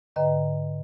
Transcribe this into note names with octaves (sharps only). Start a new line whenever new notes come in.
G#2 D3 B4 D#5 G5 A#5